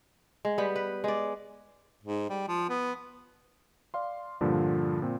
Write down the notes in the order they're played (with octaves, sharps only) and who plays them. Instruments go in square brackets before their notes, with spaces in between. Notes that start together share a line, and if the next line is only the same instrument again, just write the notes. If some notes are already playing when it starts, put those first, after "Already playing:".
[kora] G#3
G3 B3
B4
G#3 D5
[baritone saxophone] G#2
G3
F3
B3
[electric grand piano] D5 F5 C6
G2 A#2 D3 F3
A#2 C4